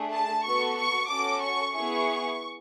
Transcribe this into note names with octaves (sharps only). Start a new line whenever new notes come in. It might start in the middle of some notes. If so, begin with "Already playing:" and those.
Already playing: A3 D4 G#4
A5
B3 F#4 A4 C#6
C#6
C#4 F#4 A4 D6
C#6
B3 E4 G#4 C#6